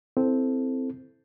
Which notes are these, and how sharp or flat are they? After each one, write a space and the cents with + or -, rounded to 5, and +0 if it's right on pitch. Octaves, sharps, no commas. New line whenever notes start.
C4 +0 E4 +0 A4 +0